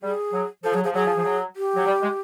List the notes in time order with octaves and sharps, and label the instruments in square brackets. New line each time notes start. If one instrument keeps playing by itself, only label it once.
[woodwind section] G3 [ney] G#4
[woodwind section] F#3
[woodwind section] F3 [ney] A4
[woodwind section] F#3 [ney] G#4
[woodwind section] F3 [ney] G#4
[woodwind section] F#3 [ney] G#4
[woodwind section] F3
F3
F#3
[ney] G4
[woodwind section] F#3
G3
G#3